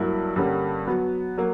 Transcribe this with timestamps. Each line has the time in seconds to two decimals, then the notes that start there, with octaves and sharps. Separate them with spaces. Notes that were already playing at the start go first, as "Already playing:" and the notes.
Already playing: G2 F#3 A#3 E4
0.36 G2 D3 G3 A#3 C#4
0.87 F#3 B3 F#4
1.38 F#3 A#3